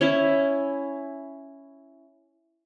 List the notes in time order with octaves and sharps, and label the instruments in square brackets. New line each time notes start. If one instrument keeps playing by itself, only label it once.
[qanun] C#4 E4 E5